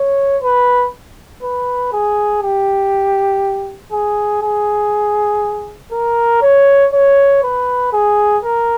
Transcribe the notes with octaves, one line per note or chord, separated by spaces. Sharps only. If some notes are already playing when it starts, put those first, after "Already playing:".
Already playing: C#5
B4
B4
G#4
G4
G#4
G#4
A#4
C#5
C#5
B4
G#4
A#4